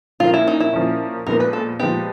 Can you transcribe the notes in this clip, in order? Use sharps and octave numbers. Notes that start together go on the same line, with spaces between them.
A#2 F3 A#3 C#4 F4
E4
D#4
E4
A#2 F3 A#3 C#4
A#2 F3 G#3 B3 A#4
B4
A4
A#2 F3 G#3 B3 G4